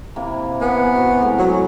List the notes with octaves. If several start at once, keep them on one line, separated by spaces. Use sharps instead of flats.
C3 A#3 E4
B3 F#5 G#5
F#4 A#4 C5
A2 G#3 A#4
F#3